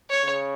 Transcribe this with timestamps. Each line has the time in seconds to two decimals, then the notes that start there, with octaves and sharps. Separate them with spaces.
0.10 C#5
0.24 C#3